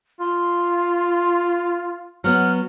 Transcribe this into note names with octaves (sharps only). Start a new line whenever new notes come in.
F4 C6
F#3 B3 F6